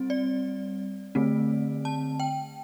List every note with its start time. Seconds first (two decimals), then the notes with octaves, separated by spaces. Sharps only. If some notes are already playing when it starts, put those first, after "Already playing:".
Already playing: G3 C4
0.10 D5
1.15 D3 A3 C4
1.85 A5
2.20 G5